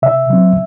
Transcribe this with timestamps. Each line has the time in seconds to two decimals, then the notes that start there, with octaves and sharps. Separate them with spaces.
0.02 C3 E5
0.30 F#3 C4